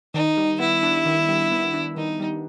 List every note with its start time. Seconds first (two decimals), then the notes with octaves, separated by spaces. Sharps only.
0.14 D#3 D#4
0.37 G3
0.60 B3 E4
0.83 D4
1.06 D#3
1.29 G3
1.52 B3
1.74 D4
1.97 D#3 D#4
2.20 G3